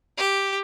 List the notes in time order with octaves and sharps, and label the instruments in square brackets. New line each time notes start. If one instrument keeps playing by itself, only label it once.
[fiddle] G4